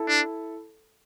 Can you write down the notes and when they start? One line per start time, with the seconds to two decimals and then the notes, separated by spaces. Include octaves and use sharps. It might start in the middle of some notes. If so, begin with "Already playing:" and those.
Already playing: E4 A4
0.08 D4